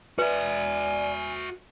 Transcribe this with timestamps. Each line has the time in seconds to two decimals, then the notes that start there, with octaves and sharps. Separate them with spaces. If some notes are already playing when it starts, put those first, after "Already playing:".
0.19 F#4 B4 D5 E5 G#5